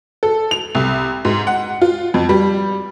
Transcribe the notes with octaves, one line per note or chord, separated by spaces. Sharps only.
A4
F7
C2
G#2
F#5
F4
F2
G3